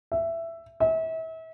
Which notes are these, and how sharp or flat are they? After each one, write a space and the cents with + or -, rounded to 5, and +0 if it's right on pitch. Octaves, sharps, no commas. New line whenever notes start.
E5 +10
E5 -35